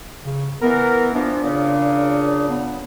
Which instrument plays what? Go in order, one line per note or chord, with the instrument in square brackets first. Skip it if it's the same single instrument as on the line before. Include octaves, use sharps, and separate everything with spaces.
[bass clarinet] C#3
[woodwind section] E3 A#4 [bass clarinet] B3
[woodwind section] E3 F3 B3 [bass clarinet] D4
[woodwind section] A#2 C#3
[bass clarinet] B3